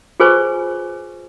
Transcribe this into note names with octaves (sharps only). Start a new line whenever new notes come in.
F4 G#4 B4 C5 G#5 C#6